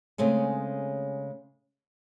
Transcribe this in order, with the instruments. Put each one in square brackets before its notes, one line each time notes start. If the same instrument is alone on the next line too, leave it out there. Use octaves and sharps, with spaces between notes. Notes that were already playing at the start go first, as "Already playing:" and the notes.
[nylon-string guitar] C#3 G#3 A3 C4 C#4